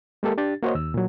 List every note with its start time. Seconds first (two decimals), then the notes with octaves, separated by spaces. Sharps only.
0.23 G#3 A#3 G4 A4 A#4
0.38 D4 G4 A6
0.63 A#3 F#4 C5 C#5 D#5
0.75 D#2 E6
0.94 A#2 F#3